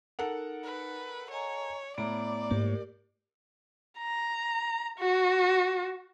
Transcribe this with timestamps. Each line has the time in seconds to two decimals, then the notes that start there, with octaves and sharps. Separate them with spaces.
0.19 D#4 A4 A#4 F#5
0.64 B4
1.31 C#5 D#5 G#5 A#5
1.98 A2 B3 D5 A#5 D6
2.51 G#2 A#3 G4 A#4
3.99 A#5
4.98 F#4